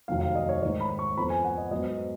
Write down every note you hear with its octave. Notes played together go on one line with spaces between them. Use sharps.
F1 D#2 D#3 F#3 F5
F5
D#5
C#5
G#2 D#3 A#3 C#5
B5
C#6
F2 F3 B3 F4 B5
G#5
F#5
D#5
G#2 F#3 B3 D#5